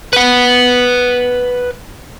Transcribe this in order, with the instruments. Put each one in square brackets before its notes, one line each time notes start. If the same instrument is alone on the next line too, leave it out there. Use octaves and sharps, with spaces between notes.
[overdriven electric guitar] B4 F#5